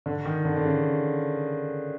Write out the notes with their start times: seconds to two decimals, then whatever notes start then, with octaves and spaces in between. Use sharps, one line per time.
0.06 D3
0.25 D#3
0.45 D3
0.56 D3
0.65 C#3